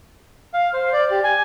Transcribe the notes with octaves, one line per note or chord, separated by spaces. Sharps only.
F5
C5
D5
G4
G#5